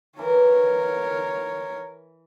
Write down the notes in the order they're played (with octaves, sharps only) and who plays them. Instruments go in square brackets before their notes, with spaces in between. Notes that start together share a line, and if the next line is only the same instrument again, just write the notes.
[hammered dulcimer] E3 [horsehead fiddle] A#4 C#5